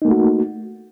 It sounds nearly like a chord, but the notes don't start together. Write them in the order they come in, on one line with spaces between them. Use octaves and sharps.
D#4 A#3 A3 F#4